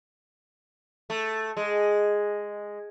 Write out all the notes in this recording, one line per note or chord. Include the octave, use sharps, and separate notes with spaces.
A3
G#3